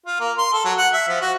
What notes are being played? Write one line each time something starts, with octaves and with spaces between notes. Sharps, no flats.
F4
A#3
C6
A4
F#3
F#5
E5
F3
F#4